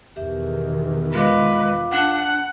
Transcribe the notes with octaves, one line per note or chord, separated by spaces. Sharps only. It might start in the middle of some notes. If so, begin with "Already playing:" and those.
E2 B2 D#3 G4 E5
G#3 F4 B4 F5 D6
D4 F#5